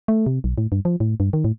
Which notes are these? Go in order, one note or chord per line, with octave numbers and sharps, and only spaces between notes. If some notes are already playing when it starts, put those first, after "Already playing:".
A3
C3
B1
A2
G2
F3
A2
G2
D#3
A2